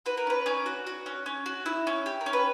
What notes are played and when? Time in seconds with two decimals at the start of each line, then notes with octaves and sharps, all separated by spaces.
0.06 F#4 B4
0.17 A#4
0.27 C#4 B4
0.46 C#4 D5
0.66 F#4
0.87 F#4
1.06 C#4
1.26 C#4
1.46 F#4
1.66 E4
1.87 C#4
2.06 G4
2.21 A#4
2.26 C#4
2.33 B4